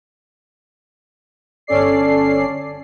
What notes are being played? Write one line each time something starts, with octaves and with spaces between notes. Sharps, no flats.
G1 C#4 A4 D5 C7